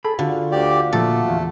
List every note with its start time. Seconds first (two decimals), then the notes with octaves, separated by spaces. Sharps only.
0.05 G#4 A4 B5
0.19 D3 F4 F#4
0.52 D2 G4 D5
0.93 A#2 F3 A3 A4
1.28 E2